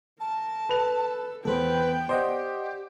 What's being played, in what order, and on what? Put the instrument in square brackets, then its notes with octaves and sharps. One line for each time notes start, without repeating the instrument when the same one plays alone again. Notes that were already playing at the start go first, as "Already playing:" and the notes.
[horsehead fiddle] A#4 [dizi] A5
[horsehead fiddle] A4 [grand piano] B4 F7
[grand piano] E2 [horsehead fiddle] B3 G5 [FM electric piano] A4 C5 [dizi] B4
[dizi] G4 [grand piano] C5 [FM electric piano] D5 D#5 F#5